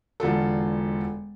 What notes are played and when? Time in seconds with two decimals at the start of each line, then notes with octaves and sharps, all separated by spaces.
0.20 E1 D3 F4 A4